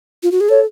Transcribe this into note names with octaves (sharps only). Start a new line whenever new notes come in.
F4
F#4
G#4
A4 C#5